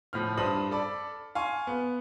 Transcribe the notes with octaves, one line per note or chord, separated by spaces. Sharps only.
A2 F3 F6
G2 C5 D#6 F#7
A4 D5 B5
F5 G#5 C6 C#6
B3